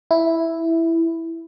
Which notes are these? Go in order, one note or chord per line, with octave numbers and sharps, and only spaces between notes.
E4